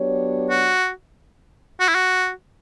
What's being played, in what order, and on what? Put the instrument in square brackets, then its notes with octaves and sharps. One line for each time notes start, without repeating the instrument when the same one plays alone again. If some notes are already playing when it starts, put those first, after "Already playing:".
Already playing: [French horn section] F#3 B3 D4 G4 C#5
[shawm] F#4
F#4
E4
F#4